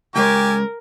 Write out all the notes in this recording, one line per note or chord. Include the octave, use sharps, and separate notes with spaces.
C#2 G#3 G4 A#4 C#5 G#5